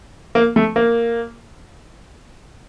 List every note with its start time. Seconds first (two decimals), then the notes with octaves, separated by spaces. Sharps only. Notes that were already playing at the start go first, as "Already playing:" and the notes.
0.35 A#3
0.56 A3
0.76 A#3